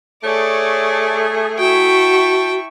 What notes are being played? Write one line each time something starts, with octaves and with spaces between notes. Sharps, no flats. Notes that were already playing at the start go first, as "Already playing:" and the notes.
A3 G#4 C#5 D5
E4 F#4 E5 G5 A5 C#6